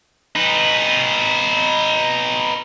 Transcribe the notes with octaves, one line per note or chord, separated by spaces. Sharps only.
D#4 B4